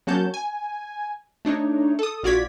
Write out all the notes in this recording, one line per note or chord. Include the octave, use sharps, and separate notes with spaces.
F#3 A#3 C#4 F#4 A5 G6
G#5
A3 D4 D#4 C#5
A4 D#6
A#1 F4 F#4 D5 G#6 B6